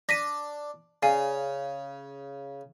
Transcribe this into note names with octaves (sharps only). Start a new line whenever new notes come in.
D4 A#6 B6 D#7
C#3 D5 F5 G#5